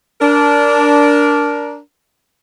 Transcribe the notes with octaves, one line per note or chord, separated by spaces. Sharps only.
D4 A#4